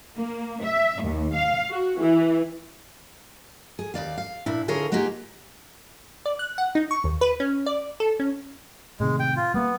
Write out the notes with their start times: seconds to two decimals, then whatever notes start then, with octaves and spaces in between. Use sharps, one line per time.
0.18 A#3
0.63 E5
1.03 D#2
1.34 F5
1.70 F#4
1.99 E3
3.79 G#4
3.94 D#2 D#3 D5 F5
4.17 F5
4.46 A#2 D4 E4
4.68 D3 F4 G#4 A#4 C#5
4.92 F#3 A#3 D#4 F4 G4 G#4
6.26 D5
6.39 F#6
6.58 F#5
6.75 D#4
6.91 C#6
7.04 D#2
7.21 B4
7.40 C#4
7.66 D5
8.00 A4
8.20 C#4
9.00 A2 C3 D#3 G#3
9.20 G5
9.36 F4
9.54 G3 A#3 B3